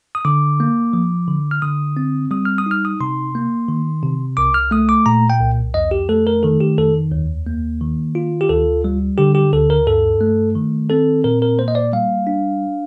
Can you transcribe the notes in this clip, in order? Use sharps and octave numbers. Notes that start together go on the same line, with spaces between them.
D#6
D3 D6
A#3
F3
D3
F6
D3 D#6
C4
G3 D#6
F6
D#6
D#4 F6
D#6
C3 C6
A#3
D#3
C3
C2 D6
F6
A3 D#6
D6
A#2 A#5
G5
C2
F2 D#5
G4
A3 A4
A#4
D#3 A4
G4
F2 A4
D#2
A#3
D#3
F4
G4
D2 A4
G3
D3 G4
G4
D2 A4
A#4
G2 A4
A3
D#3
C4 A4
A#2 A#4
A#4
A#3 C5
D#5
D5
G3 F5
D4